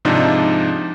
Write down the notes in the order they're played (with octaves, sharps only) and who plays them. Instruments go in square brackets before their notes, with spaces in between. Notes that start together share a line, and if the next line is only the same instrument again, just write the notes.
[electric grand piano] G#2 C3 F3 D4 D#4